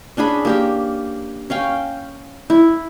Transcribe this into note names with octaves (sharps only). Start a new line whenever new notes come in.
C#4 D4 G#4 B5
A#3 G4 A#4
C#4 F5 G5
E4